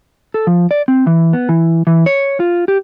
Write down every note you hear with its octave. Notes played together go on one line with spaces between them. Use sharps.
A4
F3
D5
C4
E3
B3
E3
E3
C#5
F4
G4